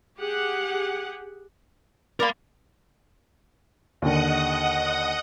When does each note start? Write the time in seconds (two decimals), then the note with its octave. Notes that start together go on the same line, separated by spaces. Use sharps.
0.16 G4 G#4 F#5
2.20 A#4 D5 F5 B5 C6
4.02 D#2 D3 D#5 F#5 D#6